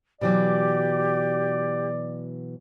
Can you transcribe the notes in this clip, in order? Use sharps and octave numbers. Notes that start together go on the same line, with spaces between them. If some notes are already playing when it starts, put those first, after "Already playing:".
B2 E3 F#3 G4 D5